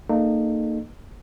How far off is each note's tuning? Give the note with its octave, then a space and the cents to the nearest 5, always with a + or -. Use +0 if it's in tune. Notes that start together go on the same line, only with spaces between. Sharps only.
A#3 -30 D#4 -30 A4 -45